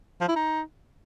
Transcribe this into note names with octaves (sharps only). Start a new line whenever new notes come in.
F3
E4
D#4